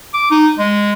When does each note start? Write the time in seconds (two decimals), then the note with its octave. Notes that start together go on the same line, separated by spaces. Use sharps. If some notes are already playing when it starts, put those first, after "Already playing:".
0.14 D6
0.31 D#4
0.59 G#3